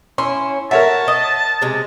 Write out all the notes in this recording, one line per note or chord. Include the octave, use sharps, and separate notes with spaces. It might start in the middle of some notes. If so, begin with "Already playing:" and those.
C#4 E4 C6
F#4 A#4 C#5 E5 A5
D#5
C3 G#3